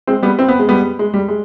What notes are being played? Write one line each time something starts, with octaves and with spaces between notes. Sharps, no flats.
G#3 C4
G3 B3
C4
B3
G#3
G3 B3
G#3
G3
G#3